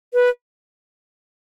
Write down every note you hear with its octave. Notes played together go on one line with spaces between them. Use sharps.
B4